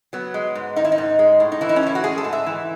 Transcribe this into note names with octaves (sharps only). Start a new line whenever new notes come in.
F#3 B3
G#3
G#2
D#3 D#4
E4
D#4
G#2
G#3
A2
D#4
E3 E4
D#4
C#4
A2 E4
F#4
G#3 G#4
A4
G#2
E5
E3